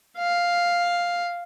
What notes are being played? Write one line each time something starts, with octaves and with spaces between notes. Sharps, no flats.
F5